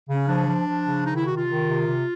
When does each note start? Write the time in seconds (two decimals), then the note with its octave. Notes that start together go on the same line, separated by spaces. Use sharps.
0.08 C#3
0.14 C#4
0.28 F3 D4
0.47 F3
0.68 F3
0.87 C#3
1.06 D#3 D#4
1.17 E4
1.26 C3 F#4
1.37 F4
1.47 D#3
1.67 C3
1.86 C3